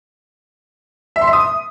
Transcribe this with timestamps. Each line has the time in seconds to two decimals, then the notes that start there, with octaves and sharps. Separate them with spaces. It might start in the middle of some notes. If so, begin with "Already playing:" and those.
1.16 E5
1.22 C6
1.27 E5
1.33 D#6